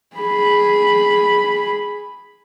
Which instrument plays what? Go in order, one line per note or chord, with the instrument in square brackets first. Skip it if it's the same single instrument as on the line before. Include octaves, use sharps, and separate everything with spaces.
[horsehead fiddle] G#4 B5